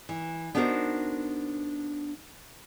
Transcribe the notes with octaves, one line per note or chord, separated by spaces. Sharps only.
E3
B3 D4 D#4 F#4 A#4 C5